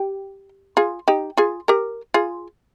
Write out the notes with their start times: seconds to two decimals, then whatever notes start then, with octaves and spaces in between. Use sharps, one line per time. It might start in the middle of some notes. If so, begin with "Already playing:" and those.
Already playing: G4
0.77 F4 G#4
1.08 D#4 G4
1.37 F4 G#4
1.68 G4 A#4
2.14 F4 G#4